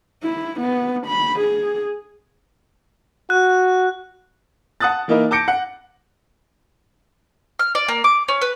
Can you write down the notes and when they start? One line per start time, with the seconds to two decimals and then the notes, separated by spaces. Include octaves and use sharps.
0.23 E4
0.60 B3
1.07 B5
1.39 G#4
3.30 F#4 F#6
4.80 F#5 A5 D#6 F#6 A6
5.08 E3 A#3 D#4 E4 A#4
5.31 A5 D6 G6 A#6 C#7 D7
5.48 F#5
7.59 F6
7.75 D5
7.88 A#3
8.04 D6
8.28 C#4
8.41 B4